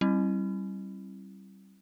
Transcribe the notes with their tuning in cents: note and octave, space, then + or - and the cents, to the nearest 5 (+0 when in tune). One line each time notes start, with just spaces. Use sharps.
G3 -15 C4 +35 E4 +0